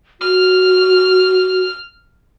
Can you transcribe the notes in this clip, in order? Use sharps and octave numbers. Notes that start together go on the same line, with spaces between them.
F#4 F6